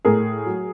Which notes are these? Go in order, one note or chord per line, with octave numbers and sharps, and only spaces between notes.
A2 G#4 A#4
F#3